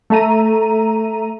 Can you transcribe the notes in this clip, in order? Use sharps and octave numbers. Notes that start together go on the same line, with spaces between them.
A3 A4 E5 A#5 D#7